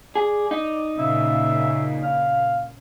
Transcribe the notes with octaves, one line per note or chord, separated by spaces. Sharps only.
G#4 D5
D#4
A#2 C#3 E5
F5